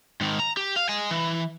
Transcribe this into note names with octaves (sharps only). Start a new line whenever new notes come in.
G#2 D#3
A#5
G4
F5
D#5 G#5
E3